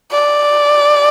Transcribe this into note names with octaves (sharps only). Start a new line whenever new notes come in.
D5